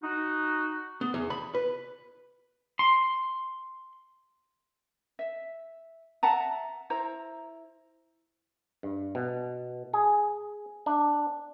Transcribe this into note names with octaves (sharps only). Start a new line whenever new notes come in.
D#4 F#4
B3
E2
B5
B4
C6
E5
E5 F#5 A5 A#5
E4 C5 A#5
G2
B2
G#4
D4